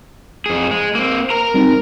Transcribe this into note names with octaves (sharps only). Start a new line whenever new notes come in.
F2 G#4
G#3
A#3 C4
A#4 A#5
G3 C4 D#4